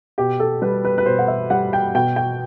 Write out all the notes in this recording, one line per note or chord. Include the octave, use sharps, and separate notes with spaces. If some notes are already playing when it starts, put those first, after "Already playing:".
B2 G4
A4
G3 B4
B4
B4
B2 C5
F#5
E5
G3 F#5
G5
B2 G5
G5